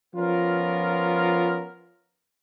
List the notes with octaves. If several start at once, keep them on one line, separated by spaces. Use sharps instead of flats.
F3 B3 C#4 F4 A#4